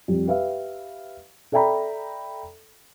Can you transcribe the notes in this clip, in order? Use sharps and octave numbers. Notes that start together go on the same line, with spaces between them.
F2 G3
G4 B4 E5 F5
A4 D5 E5 G5 A#5 B5